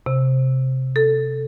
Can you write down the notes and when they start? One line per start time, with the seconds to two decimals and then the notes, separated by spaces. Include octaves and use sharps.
0.06 C3
0.96 A4